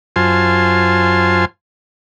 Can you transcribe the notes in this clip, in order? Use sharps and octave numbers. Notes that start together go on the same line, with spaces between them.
F#2 F4 C5 G#5 A5 C6